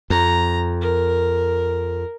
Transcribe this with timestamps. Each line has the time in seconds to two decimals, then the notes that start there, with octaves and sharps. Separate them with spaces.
0.10 F2 A#5
0.81 A#4